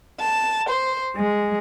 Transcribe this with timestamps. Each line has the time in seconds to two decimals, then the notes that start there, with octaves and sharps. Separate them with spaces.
0.22 A5
0.68 C5
1.16 G#3